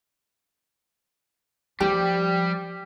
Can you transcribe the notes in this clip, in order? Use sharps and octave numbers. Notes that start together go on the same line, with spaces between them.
F3 G3 G4